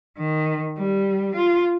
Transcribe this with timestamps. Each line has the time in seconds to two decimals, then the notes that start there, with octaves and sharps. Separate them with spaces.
0.19 D#3
0.79 G3
1.35 F4